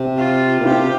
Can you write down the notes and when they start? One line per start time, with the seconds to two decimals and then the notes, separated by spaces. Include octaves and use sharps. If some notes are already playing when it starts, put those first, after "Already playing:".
Already playing: C3
0.18 F4
0.60 A#2
0.66 C3 G4